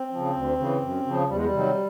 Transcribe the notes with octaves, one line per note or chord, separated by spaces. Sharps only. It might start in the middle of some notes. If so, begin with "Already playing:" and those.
Already playing: C4
C#3 F3
D2
C#3 E3
F#2
C#3 F3
E2 G3
G#3
G3
C3 D#3 F#3